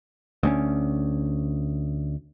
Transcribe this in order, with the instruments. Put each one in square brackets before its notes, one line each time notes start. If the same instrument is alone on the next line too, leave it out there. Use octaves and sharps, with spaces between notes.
[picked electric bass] D2 G#3 C#4